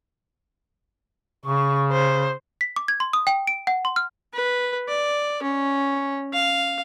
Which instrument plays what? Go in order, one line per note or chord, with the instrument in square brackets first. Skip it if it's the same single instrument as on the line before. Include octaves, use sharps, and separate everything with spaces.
[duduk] C#3 [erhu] C#6
[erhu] C5
[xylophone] B6
D6
G#6
C6
D#6
G5
D7
F#5
C6
F6
[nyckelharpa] B4
D5
C#4
F5